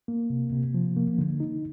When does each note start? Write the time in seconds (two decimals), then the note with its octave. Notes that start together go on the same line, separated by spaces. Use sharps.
0.08 A#3
0.30 C3
0.53 C3
0.74 F3
0.96 A#3
1.18 D3
1.40 D#4